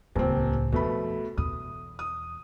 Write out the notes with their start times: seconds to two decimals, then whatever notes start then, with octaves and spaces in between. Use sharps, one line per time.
0.16 D#1 C#2 A2 C4
0.72 F2 B2 A3 B5
1.37 E2 B2 D#6
1.99 D#6